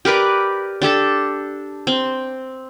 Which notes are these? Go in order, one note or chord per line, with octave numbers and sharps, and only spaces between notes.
G4 A#4 B4 D5
D4 G4 A4 A5
C4